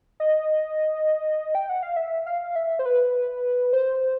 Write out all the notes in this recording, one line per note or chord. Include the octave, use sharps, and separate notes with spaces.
D#5
G5
F#5
F5
E5
F5
E5
C5
B4
C5